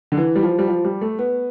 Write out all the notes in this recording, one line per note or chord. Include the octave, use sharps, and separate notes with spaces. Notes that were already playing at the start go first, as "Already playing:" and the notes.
D3
E3
G3
F3
G3
F3
G3
A3
B3